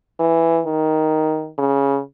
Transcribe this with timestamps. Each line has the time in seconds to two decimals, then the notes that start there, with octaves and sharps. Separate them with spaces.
0.20 E3
0.66 D#3
1.58 C#3